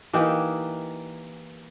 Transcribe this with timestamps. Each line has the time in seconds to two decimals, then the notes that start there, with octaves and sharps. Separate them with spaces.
0.13 E3 A#3 D#4 G4